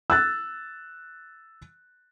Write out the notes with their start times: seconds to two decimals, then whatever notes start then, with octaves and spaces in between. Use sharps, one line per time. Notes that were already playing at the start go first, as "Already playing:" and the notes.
0.10 E6 F#6 A6